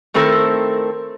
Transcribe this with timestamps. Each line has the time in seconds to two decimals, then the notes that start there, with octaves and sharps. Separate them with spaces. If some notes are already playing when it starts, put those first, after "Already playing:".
0.14 D#3 A3 C4 E4 A4 A#4